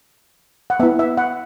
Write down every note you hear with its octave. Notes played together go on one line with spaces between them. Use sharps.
F#5
B3 E4 E5
E5
F#5